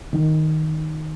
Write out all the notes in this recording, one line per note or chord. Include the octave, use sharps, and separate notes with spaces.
D#3